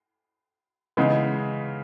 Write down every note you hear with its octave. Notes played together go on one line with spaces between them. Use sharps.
C#3 E3 G#3 B3 D#4